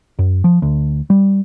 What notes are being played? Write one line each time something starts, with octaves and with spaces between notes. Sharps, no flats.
F#2
F3
D2
G3